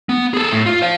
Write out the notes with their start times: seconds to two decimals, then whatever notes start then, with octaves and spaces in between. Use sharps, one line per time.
0.09 B3
0.34 G#4 A4
0.52 A2
0.66 F4
0.82 C5 F5